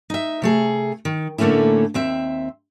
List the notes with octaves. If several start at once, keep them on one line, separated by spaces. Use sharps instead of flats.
D#4 E5
C3 A3 G#4
D#3
A2 D3 A3 A#3 C#4 E4
D#2 C4 E5